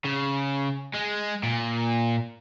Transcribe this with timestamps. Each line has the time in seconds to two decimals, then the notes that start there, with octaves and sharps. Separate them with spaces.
0.05 C#3
0.95 G#3
1.43 A#2